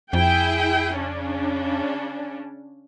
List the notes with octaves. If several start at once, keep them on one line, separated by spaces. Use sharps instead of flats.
F2 E4 G#4 G5
C#3 C#4 D4